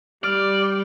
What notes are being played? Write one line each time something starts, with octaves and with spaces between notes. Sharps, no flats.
G3 D5 G5 F6